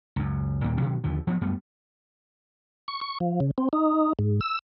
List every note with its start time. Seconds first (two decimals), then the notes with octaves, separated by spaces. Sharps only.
0.16 C#2 F#2
0.64 D#2 A#2 G3 A#3
0.78 B2 D#3 F#3 C#4
1.04 D#2 D3 F3
1.27 F3 F#3 A#3 B3
1.41 F#2 G3 A3 B3
2.88 C#6
3.01 C#6
3.20 F3
3.40 C#3
3.58 C4
3.73 D#4
4.19 G#2
4.41 E6